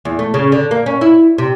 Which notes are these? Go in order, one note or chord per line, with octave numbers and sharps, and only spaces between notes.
E2
A3
C#3
D3
A#3
C#4
E4
C3